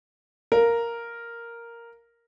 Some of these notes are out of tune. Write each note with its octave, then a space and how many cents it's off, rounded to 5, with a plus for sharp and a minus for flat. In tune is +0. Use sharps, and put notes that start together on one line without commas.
A#4 +0 F5 +0